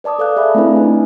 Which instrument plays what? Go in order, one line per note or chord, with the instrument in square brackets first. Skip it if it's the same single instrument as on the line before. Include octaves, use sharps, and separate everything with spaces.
[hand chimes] B4 D5 A5 D6 D#6
A4 D5 F5 F#6
G#4 E5 G#5 B5
A3 C4 D4 E4 B4
D#4 G#5